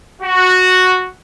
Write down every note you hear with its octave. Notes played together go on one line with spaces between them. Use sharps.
F#4